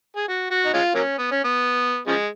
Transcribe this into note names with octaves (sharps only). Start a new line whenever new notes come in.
G#4
F#4
F#4
D#4
G#3 C#4 F4
F#3 A#3 C#4
B3
C#4
B3
C#3 F3 G#3